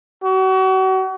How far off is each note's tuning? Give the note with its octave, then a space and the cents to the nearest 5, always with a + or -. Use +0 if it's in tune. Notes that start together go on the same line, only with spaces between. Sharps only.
F#4 +35